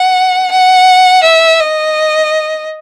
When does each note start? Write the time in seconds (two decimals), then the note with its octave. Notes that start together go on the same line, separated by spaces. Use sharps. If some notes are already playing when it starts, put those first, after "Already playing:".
Already playing: F#5
0.52 F#5
1.24 E5
1.60 D#5